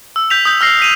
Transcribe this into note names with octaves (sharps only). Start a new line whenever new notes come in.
E6
G6 B6 F7
D#6 G6
E6 F6 A#6 C7
B6 D#7 F7